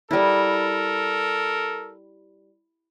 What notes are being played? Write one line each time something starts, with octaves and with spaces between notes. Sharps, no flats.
G3 E4 A4 A#4